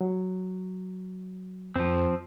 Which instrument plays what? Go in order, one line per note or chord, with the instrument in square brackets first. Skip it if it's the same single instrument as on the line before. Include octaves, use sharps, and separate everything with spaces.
[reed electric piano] F#3
[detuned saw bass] F2 [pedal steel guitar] F3 C4